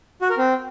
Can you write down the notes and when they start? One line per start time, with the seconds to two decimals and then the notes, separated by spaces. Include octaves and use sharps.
0.22 F#4
0.30 A#4
0.38 C4